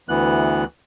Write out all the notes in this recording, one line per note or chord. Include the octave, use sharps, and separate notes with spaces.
D2 E3 B3 F#6